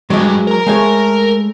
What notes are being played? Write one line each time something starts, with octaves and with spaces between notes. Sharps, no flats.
G2 F#3 G#3
A#4 A#5
G#3 A3 C#5